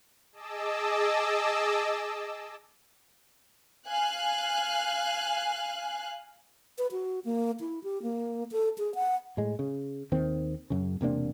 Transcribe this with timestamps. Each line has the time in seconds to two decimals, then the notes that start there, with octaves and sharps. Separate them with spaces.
0.32 G#4 D#5 A5 D6 E6
3.88 F5 G#5 F#6
6.78 B4
6.92 F#4
7.25 A#3
7.60 E4
7.84 G4
8.02 A#3
8.52 A4
8.78 G#4
8.95 F#5
9.37 A2 G#3
9.59 C#3
10.12 D#2 D#3 C4
10.70 F#2 C#3
11.01 E1 C3 A#3 D4